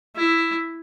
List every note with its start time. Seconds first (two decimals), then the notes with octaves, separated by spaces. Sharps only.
0.16 E4